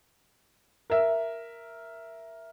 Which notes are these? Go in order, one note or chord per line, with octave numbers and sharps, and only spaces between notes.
A#4 E5